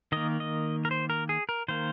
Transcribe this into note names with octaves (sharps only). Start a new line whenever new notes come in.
D#3 A#3 D#5
D#5
A#4
C5
A#4
G#4
A#4
D#3 A#3 C5